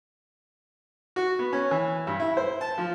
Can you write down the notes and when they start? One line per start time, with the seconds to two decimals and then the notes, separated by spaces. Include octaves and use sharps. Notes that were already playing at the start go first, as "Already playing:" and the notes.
1.16 F#4
1.39 B3
1.53 C#4
1.71 E3
2.07 G2
2.20 E4
2.37 C5
2.61 A5
2.78 F3